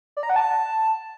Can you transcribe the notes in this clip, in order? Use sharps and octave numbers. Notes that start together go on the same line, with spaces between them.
D5
A#5
F#5
A5